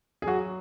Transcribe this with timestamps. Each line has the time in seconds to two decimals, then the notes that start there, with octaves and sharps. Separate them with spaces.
0.22 G#4
0.27 F#3 F#4